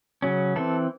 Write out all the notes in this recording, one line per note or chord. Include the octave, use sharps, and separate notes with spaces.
C#3 F#3 C#4
E3 C4 A4